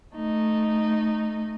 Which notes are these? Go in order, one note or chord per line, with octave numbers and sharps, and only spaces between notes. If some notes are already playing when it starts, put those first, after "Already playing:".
A3 D#4